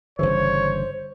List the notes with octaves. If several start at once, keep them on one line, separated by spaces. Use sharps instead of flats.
G1 C#3 E3 C5 C#5